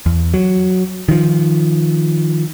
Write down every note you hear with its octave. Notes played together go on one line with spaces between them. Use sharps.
E2
F#3
D#3 F3